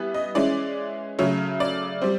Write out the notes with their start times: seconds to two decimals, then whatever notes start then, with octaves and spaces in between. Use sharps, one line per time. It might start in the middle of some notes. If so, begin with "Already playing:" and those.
Already playing: E3 G3 B3
0.14 D#5
0.35 E3 G#3 C#4 D5
1.19 C#3 F#3 A3 C#5
1.60 D5
2.02 G3 C4